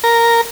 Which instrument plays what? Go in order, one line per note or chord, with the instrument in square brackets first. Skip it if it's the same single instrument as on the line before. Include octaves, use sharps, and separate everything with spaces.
[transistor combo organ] A#4